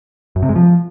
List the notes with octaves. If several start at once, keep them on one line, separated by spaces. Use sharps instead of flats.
F#2
C3
G#3
F3